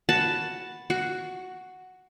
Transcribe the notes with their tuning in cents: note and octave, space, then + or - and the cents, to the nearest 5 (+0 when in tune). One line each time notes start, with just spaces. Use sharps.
F#4 +0 B4 +0 A5 +0
F#4 +0 C#6 +25